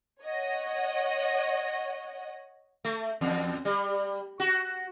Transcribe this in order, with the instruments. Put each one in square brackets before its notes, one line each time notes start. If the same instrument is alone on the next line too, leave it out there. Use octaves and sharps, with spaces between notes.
[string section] C#5 D#5 F#5
[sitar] A3
E2
G3
F#4